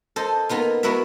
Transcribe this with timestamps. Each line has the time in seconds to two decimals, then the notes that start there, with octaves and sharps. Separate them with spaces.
0.16 A4 C5 D#5
0.49 A#3 B3 D#4 F4
0.83 B3 E4 F#4 A#4 E5